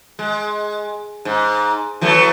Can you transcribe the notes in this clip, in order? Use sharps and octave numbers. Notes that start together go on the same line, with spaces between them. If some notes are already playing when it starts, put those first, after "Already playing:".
G#3
G#2
E3 F#3 A3